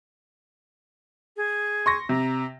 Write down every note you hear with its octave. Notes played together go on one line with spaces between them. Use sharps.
G#4
C6 C#6 A#6
C3 A#5